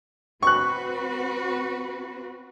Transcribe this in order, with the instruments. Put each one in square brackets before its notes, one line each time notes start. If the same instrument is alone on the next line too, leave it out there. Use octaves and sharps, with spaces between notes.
[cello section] C4 F#4 B4 [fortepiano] C#6 F#6